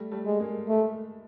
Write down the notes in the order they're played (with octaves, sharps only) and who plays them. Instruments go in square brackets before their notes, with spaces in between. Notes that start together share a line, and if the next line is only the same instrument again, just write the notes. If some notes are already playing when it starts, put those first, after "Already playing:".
Already playing: [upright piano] G3 A3
G3 A3
[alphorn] G#3
[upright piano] G#3 A#3
[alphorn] A3